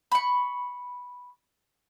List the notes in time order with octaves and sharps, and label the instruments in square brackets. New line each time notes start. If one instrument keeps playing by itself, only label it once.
[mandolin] B5 C#6